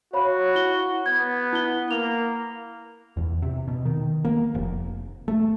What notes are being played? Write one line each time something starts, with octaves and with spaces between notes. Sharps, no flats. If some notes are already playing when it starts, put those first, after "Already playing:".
F#4 C#5 F5 B5
E4 G7
B3 G#6
E4 F#6 G7
A#3 F7
E2
C3
B2
D#3
A#3
F1
A3